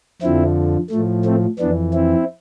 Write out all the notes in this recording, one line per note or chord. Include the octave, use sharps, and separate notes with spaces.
F2 D3 F3 C4 E4
A2 F3 A3
A3 C4
F2 E3 B3 D4
C4 E4